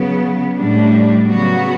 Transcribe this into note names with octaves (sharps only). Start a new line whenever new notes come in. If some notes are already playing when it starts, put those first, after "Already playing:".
Already playing: C#3 F#3 B3
A2 G3 D4
C#3 F#3 B3 F#4